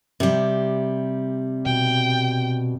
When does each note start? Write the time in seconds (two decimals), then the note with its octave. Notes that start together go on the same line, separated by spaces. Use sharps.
0.20 C3 G3
1.66 B2 G5